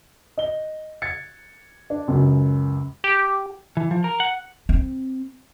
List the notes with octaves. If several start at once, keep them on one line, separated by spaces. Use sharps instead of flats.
D#5 G7
G#6 A6 C#7
D4
C#2 F#2
G4
E3
F3
A#4
F#5
C4